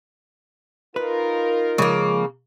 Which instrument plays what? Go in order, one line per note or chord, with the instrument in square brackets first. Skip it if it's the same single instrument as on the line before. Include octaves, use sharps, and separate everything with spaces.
[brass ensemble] D#4 F4 A#4 [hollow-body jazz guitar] B4
[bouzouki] C#3 A#3 [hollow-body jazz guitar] F3 G#3